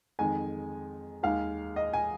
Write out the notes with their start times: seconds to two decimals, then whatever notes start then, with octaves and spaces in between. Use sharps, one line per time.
0.19 F2 D#3 G#3 G#5
1.23 D#2 D#3 G#3 F5
1.76 D#5
1.93 G#5